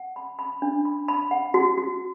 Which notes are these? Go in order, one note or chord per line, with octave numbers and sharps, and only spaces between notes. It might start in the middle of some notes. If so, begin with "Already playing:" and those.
Already playing: F#5
B5
B5
D4
B5
B5
F#5
F#4
F#4